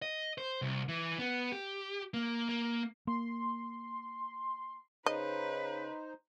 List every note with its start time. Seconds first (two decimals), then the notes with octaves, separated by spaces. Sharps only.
0.02 D#5
0.38 C5
0.62 C2
0.89 E3
1.19 B3
1.52 G4
2.14 A#3
2.49 A#3
3.07 A#3 C6
5.06 C#3 D#4 B4 C5 D#5